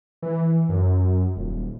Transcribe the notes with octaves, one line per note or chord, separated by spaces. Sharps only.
E3
F#2
D#1